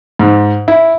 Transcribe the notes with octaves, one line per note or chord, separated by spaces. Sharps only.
G#2
E4